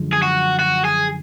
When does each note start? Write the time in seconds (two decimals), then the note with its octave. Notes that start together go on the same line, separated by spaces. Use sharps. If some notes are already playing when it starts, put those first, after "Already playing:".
Already playing: F#2 D3 F3 G#3
0.13 G#4
0.22 F#4
0.59 F#4
0.85 G#4